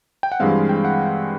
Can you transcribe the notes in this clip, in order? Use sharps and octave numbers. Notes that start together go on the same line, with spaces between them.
G5
F#5
G2 E3 G#3 C4 F5
G5
F#5